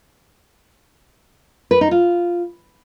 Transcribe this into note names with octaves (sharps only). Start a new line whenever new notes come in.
B4
D#4
F4